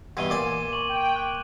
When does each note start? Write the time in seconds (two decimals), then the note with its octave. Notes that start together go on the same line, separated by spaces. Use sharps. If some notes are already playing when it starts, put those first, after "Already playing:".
0.17 G2 B2 E3 G#6 D#7 G7
0.30 A#2 D5 G#5 D6
0.73 C#6 F#7
0.89 G5
1.14 D6 F#6 F#7